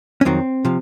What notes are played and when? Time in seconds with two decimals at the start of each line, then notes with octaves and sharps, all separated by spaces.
0.21 C#4
0.25 F2 D#3 F#3 C4
0.65 C3 F3